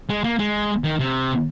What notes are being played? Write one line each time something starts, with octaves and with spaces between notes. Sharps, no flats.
G#3
A#3
G#3
D#3
C3